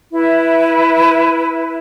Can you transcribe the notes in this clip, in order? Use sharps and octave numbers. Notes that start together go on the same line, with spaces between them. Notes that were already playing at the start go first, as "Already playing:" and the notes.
E4 B4 E5